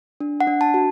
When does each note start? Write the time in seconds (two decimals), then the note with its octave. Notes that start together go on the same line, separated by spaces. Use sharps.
0.20 D4
0.40 F#5
0.47 D4
0.61 A5
0.74 F#4